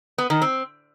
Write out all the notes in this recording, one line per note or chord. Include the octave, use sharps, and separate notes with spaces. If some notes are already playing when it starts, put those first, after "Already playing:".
B3
D#3
C4